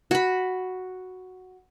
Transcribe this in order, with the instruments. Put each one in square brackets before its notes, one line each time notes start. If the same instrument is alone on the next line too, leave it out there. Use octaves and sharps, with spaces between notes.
[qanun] F#4 B5